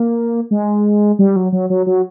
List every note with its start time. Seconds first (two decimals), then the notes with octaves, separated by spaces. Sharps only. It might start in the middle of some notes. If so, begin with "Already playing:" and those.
Already playing: A#3
0.51 G#3
1.19 G3
1.36 F#3
1.52 F#3
1.70 F#3
1.86 F#3